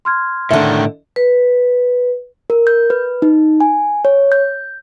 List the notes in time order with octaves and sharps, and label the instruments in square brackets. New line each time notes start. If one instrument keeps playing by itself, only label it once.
[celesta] C6 F6 G#6
[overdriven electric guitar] A2 D#3 [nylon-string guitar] D3 E5
[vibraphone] B4
[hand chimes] A#4
G6
B4
D#4
G#5
C#5
G6